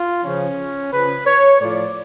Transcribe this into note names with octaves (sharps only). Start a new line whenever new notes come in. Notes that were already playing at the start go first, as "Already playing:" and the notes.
Already playing: F4
C#3 F3 C#4
C#3 F3 B4
C#5
A2 F3 D5